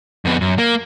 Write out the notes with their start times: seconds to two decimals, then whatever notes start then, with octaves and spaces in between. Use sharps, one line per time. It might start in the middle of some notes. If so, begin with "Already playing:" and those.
0.25 F2 B3
0.41 F#2
0.58 A#3